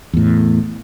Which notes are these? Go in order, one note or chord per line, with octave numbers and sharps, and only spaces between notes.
E2 A2